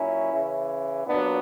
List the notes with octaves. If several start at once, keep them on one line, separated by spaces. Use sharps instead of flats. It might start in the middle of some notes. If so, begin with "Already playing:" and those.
Already playing: A#2 F#3 C#4 E4
C#3 E3
A#2 F#3 B3 D4